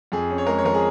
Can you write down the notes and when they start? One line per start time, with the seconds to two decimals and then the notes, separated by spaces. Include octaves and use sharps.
0.12 F2 G#4
0.30 C#4
0.38 C#5
0.46 G#3 A#4
0.58 C#5
0.65 F3 A#4
0.74 G#4